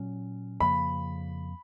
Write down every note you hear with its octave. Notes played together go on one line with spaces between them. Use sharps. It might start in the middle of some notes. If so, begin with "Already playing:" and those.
Already playing: A#2 F#3 C#4
F2 C#3 F3 A#3 B5